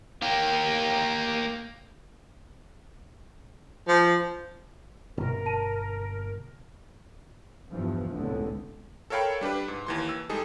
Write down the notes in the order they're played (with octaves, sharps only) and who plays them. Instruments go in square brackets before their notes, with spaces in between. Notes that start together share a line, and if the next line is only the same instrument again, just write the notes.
[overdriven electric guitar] A#3 G4
[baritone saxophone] F3
[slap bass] G1 [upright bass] B2 A#3 [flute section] A#4
[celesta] A5 D#7
[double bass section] G1 E2 G2 E3 F3
F1 C#2 A2 D3 G#3 B3
[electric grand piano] A4 A#4 C#5 F5 G5 B5
G3 D4 G4 B4
G#2
D#2 E3 C6
E6
G3 G#3 D#4 G#4 A4